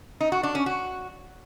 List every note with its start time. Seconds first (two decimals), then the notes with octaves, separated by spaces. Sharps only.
0.21 D#4
0.32 F#4
0.43 D4
0.55 C#4
0.66 F#4